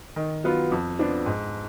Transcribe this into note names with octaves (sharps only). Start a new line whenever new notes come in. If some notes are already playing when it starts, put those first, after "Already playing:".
D#3
F#3 B3 F4
F2
F3 B3 D4
G#2